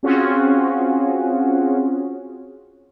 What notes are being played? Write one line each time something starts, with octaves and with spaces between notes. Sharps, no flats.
C4 C#4 F4 F#4 G#4